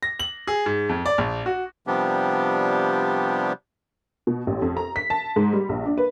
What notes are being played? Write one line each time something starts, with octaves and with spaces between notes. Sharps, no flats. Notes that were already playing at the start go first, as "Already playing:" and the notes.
A#6
F#7
G#4
G#2
F2
D5
A#1
F#4
C3 F3 G3 B3 D4 G4
B2
A1
F2
A#5
B6
A5
G#2
G3
A#1
D4
B4